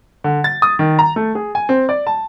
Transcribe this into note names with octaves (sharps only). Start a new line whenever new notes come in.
D3
A6
D#6
D#3
A#5
A3
G#4
G#5
C4
D5
A5